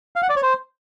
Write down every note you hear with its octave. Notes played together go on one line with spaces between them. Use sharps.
F5
F#5
D5
C#5
C5